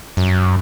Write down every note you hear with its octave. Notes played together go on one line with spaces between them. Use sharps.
F#2